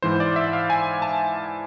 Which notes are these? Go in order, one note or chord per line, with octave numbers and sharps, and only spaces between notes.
G#2 E3 C5
D5
E5
F5
G#5
A5